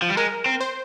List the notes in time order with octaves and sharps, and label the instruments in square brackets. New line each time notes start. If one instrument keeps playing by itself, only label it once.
[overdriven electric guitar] F3
G3
[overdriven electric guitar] G#3 [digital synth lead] A#4
[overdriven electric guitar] C4
[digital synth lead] C5